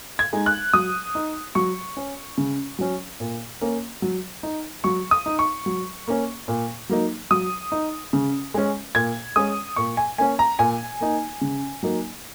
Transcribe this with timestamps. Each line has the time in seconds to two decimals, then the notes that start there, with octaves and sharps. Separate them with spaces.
0.19 G#6
0.33 G#3 D#4
0.46 F#6
0.73 F#3 D#6
1.15 D#4
1.55 F#3 C#6
1.97 C#4
2.38 C#3
2.79 F#3 C#4
3.20 A#2
3.61 A#3 C#4
4.02 F#3
4.43 D#4
4.84 F#3 C#6
5.11 D#6
5.26 D#4
5.39 C#6
5.66 F#3
6.08 A#3 C#4
6.48 A#2
6.89 F#3 A#3 D#4
7.31 F#3 D#6
7.72 D#4
8.13 C#3
8.54 G#3 C#4
8.95 A#2 G#6
9.36 G#3 C#4 D#6
9.76 A#2 C#6
9.97 G#5
10.18 A#3 C#4 G#5
10.39 A#5
10.59 A#2 G#5
11.01 A#3 D#4
11.41 C#3
11.83 F#3 A#3 D#4